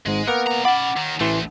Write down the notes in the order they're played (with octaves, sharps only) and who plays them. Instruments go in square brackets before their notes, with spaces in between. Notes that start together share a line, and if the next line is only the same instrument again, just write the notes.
[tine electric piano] G#1 G#2 [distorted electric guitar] G#3
[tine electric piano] A#3 B3 F#5 [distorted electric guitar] A#4
[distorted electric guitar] G3 A#5
[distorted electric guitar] C#4 B5 [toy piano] F#5 [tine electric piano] D6 A6
[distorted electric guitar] D#2 D#3
[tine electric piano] A1 E3 C6 [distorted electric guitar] D2 A3